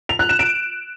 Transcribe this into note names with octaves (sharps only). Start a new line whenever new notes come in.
F7
F#6
E7
D7